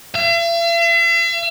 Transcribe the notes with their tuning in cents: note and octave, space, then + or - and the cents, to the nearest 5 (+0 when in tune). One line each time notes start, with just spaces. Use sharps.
E5 +45